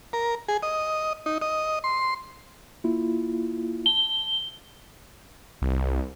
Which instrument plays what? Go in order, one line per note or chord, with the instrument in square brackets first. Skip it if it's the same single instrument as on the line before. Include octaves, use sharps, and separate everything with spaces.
[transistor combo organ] A#4
G#4
D#5
D#4
D#5
C6
[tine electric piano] A#3 E4 F4
[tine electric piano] A5 [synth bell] G7
[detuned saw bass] C2